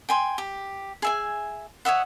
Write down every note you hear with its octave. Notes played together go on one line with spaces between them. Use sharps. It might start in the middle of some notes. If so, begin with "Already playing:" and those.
G5 G#5 C6
G4
G#4 E5 G#5
C#5 D#5 E5 F#5